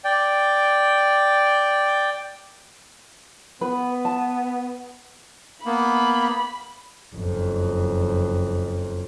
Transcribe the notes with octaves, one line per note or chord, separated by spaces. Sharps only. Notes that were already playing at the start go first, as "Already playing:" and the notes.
D5 G5
B3 B4
A5
A#3 B3 B5
F#1 F2